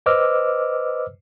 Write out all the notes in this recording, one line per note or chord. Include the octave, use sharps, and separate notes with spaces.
B4 C5 D#5 D6 E6 F6